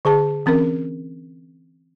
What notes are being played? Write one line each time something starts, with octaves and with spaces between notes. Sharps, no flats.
D3 G#4 A5
E3 C4 C#4 A#4